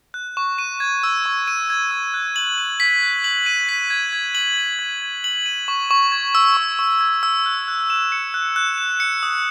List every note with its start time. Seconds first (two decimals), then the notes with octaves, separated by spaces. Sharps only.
0.14 F#6
0.37 C#6
0.58 D#7
0.80 G#6
1.03 E6
1.26 C#6
1.48 D#7
1.70 G#6
1.91 E6
2.14 F#6
2.36 F#7
2.58 D#7
2.80 B6
3.03 F#6
3.24 F#7
3.46 D#7
3.69 B6
3.90 G#6
4.13 G#6
4.35 F#7
4.57 D#7
4.79 G#6
5.02 G#6
5.24 F#7
5.46 D#7
5.68 C#6
5.91 C#6
6.12 G#6
6.35 E6
6.57 C#6
6.79 C#6
7.01 G#6
7.23 E6
7.46 F#6
7.68 F#6
7.90 E7
8.12 C#7
8.34 F#6
8.56 F#6
8.78 E7
9.00 C#7
9.23 D#6